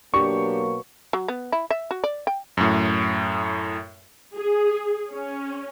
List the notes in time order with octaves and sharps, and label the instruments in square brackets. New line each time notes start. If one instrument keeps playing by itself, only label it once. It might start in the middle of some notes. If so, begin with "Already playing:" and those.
[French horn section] B2 F#3 A#3 [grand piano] D4 G4 [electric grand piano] C#6
[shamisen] F#3
B3
E4
E5
F#4
D5
G5
[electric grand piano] F#2 A2
[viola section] G#4
C#4